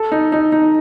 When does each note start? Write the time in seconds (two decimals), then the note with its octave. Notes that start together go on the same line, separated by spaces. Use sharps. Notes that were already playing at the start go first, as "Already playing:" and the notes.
Already playing: A4
0.12 D#4
0.32 D#4
0.52 D#4